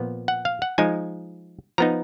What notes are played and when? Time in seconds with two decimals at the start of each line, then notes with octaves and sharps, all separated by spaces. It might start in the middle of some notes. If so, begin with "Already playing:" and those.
Already playing: A#2 F3 B3
0.28 F#5
0.45 F5
0.62 F#5
0.78 F3 G#3 D#4 G#5
1.78 F3 B3 D#4 A#5